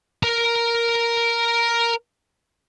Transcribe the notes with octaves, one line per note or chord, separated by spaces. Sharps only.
A#4 A#5